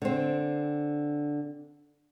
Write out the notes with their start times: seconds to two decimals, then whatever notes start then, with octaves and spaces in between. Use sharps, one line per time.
0.02 D3 C4